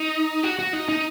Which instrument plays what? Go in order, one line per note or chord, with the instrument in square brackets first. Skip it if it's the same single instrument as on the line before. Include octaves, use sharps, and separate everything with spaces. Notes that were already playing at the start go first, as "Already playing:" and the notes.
Already playing: [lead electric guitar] D#4
F#4
F#4
D#4
D#4